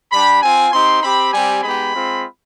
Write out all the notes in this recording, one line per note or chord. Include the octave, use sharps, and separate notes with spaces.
G3 D4 G4 B5
C4 F4 G#5
C4 D#4 G4 C6
C4 G4 B5
G3 C4 G4 G#5
G#3 B3 D#4 G4 B5
G#3 C4 F4